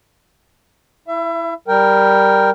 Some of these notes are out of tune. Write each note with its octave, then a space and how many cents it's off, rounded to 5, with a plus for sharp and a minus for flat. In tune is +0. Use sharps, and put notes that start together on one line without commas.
E4 +0 E5 +30
G3 +0 A#4 -5 G5 +0